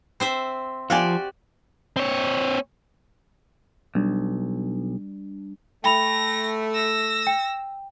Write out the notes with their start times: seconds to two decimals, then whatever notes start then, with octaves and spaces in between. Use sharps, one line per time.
0.20 C4 C5 E5
0.90 F3 F#4 G4 D5 F5 G#5
1.96 C4 C#5
3.95 B1 G3 D4
5.84 A3 G5 B5 A#6 F7
6.74 E6 A#6
7.27 G5